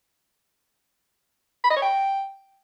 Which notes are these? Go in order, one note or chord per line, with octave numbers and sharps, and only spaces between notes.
B5
D#5
C#5
G5